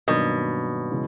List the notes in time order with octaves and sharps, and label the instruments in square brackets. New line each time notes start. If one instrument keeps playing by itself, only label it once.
[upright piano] G2 D#3 F#3 A#3 D4 [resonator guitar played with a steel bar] B2
[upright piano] C#3 E3 G#3